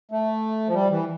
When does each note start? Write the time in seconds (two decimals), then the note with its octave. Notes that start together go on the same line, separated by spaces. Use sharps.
0.11 A3
0.68 F3
0.74 G3
0.90 E3